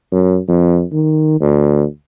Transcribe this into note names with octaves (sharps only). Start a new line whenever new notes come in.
F#2
F2
D#3
D2